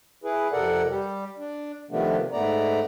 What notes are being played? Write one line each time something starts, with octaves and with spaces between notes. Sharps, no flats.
E4 G#4 B4
F2 C3 A4 A#4 D5 F#5
G3 G4
D4
C3 D#3 F3 A3 B3 D4
G#2 A3 B3 D5 A#5